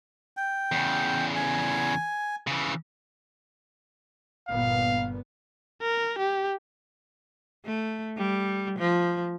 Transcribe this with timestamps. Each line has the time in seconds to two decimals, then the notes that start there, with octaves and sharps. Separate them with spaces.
0.37 G5
0.72 E2 C#3
1.36 G#5
2.47 C#3 E3
4.48 G1 A#2 B3 F5
5.82 A#4
6.19 G4
7.65 A3
8.17 G3
8.78 F3